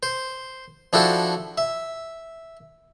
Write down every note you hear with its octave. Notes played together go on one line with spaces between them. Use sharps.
C5
F3 D4 E4 F#4 G4 A4
E5